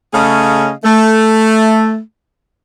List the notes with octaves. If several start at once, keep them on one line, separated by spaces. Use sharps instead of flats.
C#3 A3 C#4 G#4 D#5 F5
A3